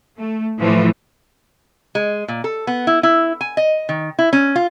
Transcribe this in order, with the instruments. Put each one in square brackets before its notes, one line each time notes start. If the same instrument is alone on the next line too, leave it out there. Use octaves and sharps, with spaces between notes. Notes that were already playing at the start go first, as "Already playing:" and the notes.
[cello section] A3
A2 E3 F3 A3
[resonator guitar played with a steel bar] G#3
A#2
A4
B3
E4
E4
G#5
D#5
D#3
E4
C#4
F4